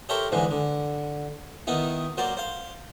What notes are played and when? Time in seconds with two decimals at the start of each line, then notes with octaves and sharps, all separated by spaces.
0.09 G4 A4 A#4 C5 C#5 E5
0.32 G#2 D3 E3 G#3
0.51 D3
1.67 D#3 B3 D#4 E4
2.17 F#3 A#3 C5 D5
2.37 C5 F5